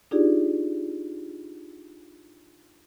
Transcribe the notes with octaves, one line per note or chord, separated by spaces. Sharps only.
D4 D#4 F4 G4 G#4 D5